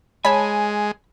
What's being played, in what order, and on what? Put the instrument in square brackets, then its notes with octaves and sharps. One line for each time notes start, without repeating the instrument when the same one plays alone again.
[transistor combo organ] G#3 [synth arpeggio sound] C#5 A5 [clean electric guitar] G#5 [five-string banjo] B5